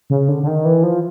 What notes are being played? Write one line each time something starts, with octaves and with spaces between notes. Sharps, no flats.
C#3
D3
D3
D#3
E3
F3